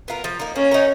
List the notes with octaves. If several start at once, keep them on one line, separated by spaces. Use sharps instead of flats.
B3 F4 A#4
F3
A#3 D#4
A#3 C#4
D#4 F#4 A#4